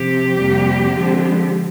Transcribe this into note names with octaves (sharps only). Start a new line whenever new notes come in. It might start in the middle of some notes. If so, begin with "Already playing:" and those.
Already playing: C3 F3 C4 G4
F2 C3 G3 A#3
D3 F3 G#3 C4